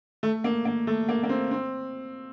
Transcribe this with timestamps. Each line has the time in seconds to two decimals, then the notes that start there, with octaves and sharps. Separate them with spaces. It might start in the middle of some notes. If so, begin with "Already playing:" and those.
0.23 A3
0.44 A#3
0.65 A#3
0.87 A3
1.09 A#3
1.23 A#3
1.29 C4
1.51 C4